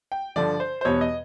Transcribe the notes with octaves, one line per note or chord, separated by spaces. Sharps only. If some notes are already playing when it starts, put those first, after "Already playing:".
G5
G2 D3 F3 D5
C5
C5
E2 B2 G3 B3 C#5
D#5